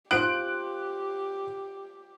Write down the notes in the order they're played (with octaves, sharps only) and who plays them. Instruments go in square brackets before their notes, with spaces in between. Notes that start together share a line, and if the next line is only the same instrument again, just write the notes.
[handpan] F4 C5 [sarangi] G4 [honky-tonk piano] F#6 D7